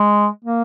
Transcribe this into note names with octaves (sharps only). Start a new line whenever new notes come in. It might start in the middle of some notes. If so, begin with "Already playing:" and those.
Already playing: G#3
A#3